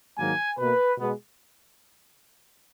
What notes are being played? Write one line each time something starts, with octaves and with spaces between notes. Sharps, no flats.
G#2 D#3 F#3 A#3 G#5
B2 A#3 B4
B2 G#3 B3